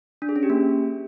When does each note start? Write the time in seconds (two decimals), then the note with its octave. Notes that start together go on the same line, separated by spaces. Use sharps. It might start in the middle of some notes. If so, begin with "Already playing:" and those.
0.22 D4
0.29 G#4
0.36 C#4
0.43 G4
0.50 A#3